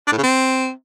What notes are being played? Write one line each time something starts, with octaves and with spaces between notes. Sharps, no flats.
D4
A2
C#3
C4